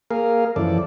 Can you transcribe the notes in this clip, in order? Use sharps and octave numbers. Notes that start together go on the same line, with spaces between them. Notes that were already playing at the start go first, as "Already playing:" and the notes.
A#3 G#4 A#4 F5
F#2 E3 F3 A4 D5